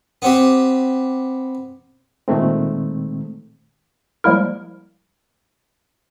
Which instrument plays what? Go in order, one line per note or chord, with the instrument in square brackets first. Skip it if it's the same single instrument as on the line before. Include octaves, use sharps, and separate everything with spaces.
[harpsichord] B3 C4 G4
[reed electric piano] A#2 D#3 G#3 A3 C4
[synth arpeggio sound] F3 G3 G#3 A#3 E4 A#4